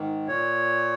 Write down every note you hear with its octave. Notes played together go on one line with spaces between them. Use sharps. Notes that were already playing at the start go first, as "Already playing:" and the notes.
Already playing: G#2 D#3
A#2 C#5